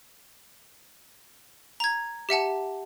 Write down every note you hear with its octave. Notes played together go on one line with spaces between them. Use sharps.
A#5 G#6
G4 E5 F#5 A5